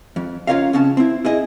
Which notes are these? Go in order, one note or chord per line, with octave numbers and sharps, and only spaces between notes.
F2
C#4 F4 A#4 C#5 D#5 F5
C#3 C4 C#4 A5
C4 E4
E4 G#4 D#5